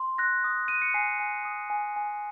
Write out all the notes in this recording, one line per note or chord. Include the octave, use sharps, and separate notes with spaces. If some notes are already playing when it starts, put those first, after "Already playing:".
Already playing: C6
F#6 A#6
D#6
F#6 D#7
C#7
G#5 C7
G#5
D#6
G#5
G#5